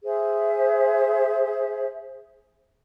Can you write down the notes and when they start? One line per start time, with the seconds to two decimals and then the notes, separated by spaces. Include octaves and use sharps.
0.04 G#4 C5 E5